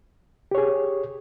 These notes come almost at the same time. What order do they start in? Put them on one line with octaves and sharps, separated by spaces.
G4 C#5 G#4